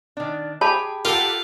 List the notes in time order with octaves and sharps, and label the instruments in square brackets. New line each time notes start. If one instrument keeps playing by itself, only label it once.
[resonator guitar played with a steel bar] D#3 D4
[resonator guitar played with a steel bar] G4 G#4 G5 [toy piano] C#5 A5 B5
[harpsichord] F4 [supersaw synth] G4 A4 F#5 [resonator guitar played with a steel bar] A#4